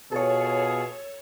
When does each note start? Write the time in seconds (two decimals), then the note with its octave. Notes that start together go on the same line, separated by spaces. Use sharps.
0.12 B2 F4 G#4 A4 C#5